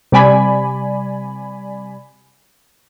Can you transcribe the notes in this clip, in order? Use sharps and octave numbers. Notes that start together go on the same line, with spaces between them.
C3 G3 D5 G#5 B5